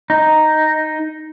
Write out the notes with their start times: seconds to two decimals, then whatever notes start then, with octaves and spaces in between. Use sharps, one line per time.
0.10 D#4